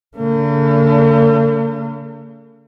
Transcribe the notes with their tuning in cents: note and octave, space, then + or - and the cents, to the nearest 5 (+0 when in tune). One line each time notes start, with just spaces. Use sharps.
D3 -45 A#3 -45